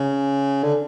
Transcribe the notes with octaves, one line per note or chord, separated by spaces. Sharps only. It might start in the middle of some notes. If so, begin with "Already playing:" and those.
Already playing: C#3
D3